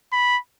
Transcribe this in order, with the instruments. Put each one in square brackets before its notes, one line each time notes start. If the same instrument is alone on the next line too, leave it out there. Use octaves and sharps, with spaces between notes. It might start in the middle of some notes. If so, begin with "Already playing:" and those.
[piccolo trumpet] B5